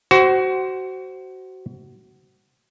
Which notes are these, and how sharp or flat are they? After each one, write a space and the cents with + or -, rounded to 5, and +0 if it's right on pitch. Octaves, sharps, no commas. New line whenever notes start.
F#4 +25 C5 +0